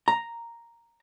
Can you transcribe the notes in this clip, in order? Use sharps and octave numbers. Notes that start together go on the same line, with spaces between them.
A#5